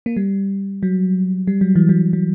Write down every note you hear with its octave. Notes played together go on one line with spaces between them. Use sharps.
A#3
G3
F#3
G3
F#3
E3
F#3
F#3